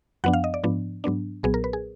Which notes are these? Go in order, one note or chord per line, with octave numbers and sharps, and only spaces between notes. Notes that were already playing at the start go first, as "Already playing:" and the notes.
F#2 F3 B3 D4 F#5
F5
D#5
D5
G#2 F3 B3 D4
G#2 F#3 B3 D4
B1 A#2 F#3 B3 G#4
A#4
B4
G#4